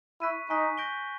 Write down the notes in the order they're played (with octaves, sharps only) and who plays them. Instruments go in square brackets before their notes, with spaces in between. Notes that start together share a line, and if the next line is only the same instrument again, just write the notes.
[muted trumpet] E4 [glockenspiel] C#6 F#6 B6 D#7
[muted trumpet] D#4 [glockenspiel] G#5 C#6 F#6 B6
[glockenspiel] G6 A#6 D7 G7